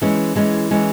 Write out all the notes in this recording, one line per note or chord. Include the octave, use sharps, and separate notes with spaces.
E3 G#3 C#4
E3 G#3 C#4
E3 G#3 C#4